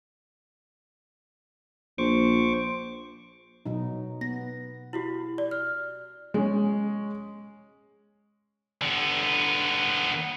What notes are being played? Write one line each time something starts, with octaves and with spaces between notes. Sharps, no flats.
A#1 C5 C#6 D6
B2 F#3 D#4
B3 A#6
E4 F#4 G4
D5
F6
G#3 C#4
D3 B3